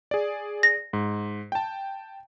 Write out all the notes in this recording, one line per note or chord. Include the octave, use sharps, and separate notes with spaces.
G#4 D5
A#6
G#2
G5 A5